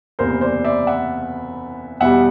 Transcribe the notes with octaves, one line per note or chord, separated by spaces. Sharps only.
F#1 E2 C3 A#4 C5
C5 D5
D5 E5
E5 F#5
E2 B2 G3 E5 F#5